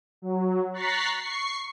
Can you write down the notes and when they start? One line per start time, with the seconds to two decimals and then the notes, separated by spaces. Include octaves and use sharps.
0.22 F#3
0.73 A#5 C#6 F#6 A6 B6 C7
1.17 C#6 C7